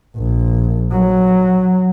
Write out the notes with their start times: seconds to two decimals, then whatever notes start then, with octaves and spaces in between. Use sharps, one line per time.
0.16 A#1
0.91 F#3